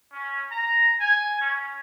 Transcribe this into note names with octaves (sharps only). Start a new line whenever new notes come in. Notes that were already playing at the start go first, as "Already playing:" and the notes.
C#4
A#5
G#5
C#4